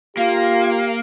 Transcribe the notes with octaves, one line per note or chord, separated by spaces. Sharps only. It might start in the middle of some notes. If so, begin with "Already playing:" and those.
A#3 F4 G4 F5